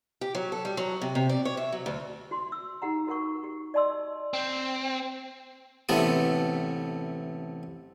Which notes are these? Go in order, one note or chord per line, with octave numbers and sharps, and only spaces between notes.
G4
F#3
A4
G3
F#3
C3
C3
D5
C#5
E5
F#3
D2
F#4 C6
E6
D#4 G4 F#5 A#5
F#4 A#4 F#5 C#6
G4
D5 D#5 A5 C6 E6
C4
A1 C3 A3 B3 D#6